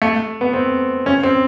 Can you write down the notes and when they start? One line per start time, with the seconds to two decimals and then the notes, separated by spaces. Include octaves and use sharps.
0.02 A3
0.41 B3
0.53 C4
1.06 C#4
1.23 C4